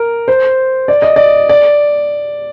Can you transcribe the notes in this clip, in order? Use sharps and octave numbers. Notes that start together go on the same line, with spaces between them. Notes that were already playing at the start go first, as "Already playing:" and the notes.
Already playing: A#4
C5
D5
D#5
D5
D5